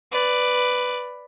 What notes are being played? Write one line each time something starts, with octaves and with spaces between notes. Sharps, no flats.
B4 D5